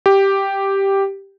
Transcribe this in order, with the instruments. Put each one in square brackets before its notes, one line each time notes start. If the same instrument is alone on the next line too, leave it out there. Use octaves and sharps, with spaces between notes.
[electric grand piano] G4